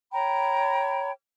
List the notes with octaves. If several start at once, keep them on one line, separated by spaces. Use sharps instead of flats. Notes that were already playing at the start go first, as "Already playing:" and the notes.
C#5 G5 A#5 B5